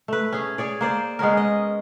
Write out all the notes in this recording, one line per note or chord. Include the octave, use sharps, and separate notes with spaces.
A3 B4
C#4 G#4
G#4 C#5 D5
A#3 C5 D5
G#3 B3 C#4 A#4
D#5